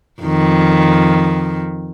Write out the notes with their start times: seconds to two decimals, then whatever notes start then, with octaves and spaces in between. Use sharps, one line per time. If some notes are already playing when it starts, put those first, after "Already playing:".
0.23 F2 D#3